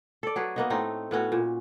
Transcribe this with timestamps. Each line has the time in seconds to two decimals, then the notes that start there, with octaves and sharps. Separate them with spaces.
0.23 A4 D5
0.36 F#3 G#4 B4
0.56 A#3 B3 D#4
0.70 A2 A3 C4 D#4
1.11 A2 B3 C#4 F#4
1.32 A#2